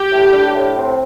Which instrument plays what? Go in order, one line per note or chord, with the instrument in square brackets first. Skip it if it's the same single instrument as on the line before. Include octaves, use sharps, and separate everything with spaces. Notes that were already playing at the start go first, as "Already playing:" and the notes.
Already playing: [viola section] G4
[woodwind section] A2
D4
A2
C4